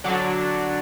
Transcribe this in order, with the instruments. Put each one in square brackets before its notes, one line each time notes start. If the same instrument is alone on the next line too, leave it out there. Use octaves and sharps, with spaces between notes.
[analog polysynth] D3 F#3 D4